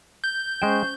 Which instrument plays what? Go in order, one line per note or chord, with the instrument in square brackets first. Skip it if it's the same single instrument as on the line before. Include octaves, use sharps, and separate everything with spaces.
[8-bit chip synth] G6
[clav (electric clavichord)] G#3 G5 [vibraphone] C#4 C5 C#6